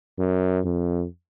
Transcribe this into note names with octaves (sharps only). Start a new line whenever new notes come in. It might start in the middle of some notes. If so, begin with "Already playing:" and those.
F#2
F2